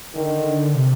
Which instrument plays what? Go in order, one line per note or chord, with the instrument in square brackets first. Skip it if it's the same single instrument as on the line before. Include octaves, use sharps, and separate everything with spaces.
[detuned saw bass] D3 [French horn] D#3
[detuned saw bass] C3